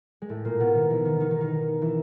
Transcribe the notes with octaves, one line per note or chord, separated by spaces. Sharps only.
G#3
A2 A3
A#2 A#3
B2 B3
D#3 D#4
E3 E4
D#3 D#4
D#3 D#4
D#3 D#4
D#3 D#4
E3 E4